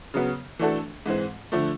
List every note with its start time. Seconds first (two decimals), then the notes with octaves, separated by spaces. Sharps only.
0.14 C#3 F#3 B3
0.59 E3 A3 D4 F#4 A4
1.06 G#2 E3 G#3 C4
1.52 D3 F3 A3